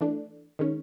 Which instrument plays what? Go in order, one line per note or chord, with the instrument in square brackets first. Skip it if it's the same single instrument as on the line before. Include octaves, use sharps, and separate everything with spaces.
[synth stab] E3 A3 D4
D#3 G#3 C#4